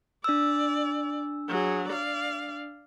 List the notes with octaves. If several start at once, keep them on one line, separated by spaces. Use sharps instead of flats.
D4 D5 E6
F#3 G#4
D5 F5